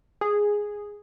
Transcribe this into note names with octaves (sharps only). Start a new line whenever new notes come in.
G#4